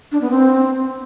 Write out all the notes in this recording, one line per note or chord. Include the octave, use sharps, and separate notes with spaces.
D4
B3
C4